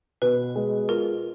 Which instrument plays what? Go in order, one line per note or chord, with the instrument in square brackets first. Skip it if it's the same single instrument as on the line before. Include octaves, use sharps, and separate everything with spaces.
[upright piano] B2 [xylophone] B4
[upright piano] G#3
[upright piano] F4 [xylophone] A#4